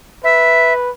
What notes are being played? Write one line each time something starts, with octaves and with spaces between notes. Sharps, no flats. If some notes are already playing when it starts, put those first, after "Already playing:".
B4 E5